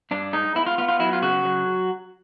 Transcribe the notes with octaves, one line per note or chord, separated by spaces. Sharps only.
G2 D4
G#3 D#4
B3 E4
F4
B3 F4
F4
F#3 E4
F4
C#3 F#4
F#3